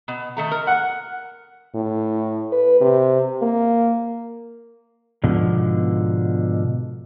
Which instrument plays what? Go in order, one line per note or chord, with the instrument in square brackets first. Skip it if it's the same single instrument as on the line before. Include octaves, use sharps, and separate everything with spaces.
[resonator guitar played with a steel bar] B2
D#3 A3 A#5
A#4
[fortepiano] F#5
[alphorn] A2
B4
C3
A#3
[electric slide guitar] G#2 B2 D3 F3